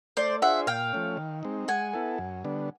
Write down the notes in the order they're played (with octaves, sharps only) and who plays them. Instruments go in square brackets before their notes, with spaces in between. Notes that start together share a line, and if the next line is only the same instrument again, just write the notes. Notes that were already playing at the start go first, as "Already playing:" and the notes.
[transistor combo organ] A3 [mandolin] C5 D5
[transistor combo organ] D4 F4 G#4 C5 [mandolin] E5 F#5
[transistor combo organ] A#2 [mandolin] F5 G5
[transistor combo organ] F3 A3 C#4
D#3
G#3 C4 D#4
[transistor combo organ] G#3 [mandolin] F#5 G#5
[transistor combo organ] B3 E4 A4
F#2
D3 G3 B3 D4